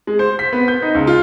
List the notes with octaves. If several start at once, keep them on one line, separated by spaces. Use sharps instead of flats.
G#3
C5
B6
B3
G6
D#4
C#2
F4